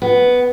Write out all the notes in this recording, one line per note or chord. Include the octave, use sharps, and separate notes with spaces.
B3